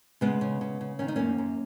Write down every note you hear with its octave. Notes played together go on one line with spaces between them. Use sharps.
C#3 G#3 B3
C#3
C#3
C#3
D#3 C#4
D#4
F#2 A#3 C#4
F#2